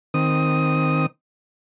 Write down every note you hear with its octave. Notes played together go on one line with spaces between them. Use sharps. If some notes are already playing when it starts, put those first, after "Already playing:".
D#3 C4 D#6